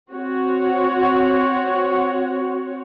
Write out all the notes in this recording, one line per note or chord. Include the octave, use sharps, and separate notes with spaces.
C4 F#4 C#5